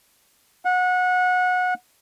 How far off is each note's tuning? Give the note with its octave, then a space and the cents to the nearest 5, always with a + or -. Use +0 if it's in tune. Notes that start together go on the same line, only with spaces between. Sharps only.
F#5 -25